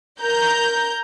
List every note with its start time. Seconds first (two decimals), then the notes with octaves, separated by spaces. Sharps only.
0.21 A#4 A#5 G6